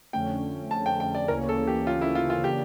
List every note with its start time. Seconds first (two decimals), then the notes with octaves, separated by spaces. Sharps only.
0.13 F2 D3 A3 C#4 G5
0.71 A5
0.86 G5
1.00 G5
1.15 D5
1.28 D2 C#3 E3 A#3 C#4 A#4
1.49 A4
1.67 G4
1.87 F4
2.01 E4
2.15 F4
2.30 F4
2.44 C#3 E3 A#3 D4 G4